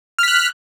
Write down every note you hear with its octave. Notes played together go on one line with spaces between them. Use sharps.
F6 F#6 B6